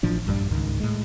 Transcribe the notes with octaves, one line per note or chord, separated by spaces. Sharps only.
A1 A2 F3 D4
A#1 G2 D#3 G3
C#2 G#2 D#3
A2 G#3